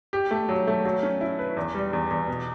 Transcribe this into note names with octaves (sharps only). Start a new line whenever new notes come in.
G4
A3
F#3
A3
F#3
C#4
E4
B4
E2
G3
E2
E2
B2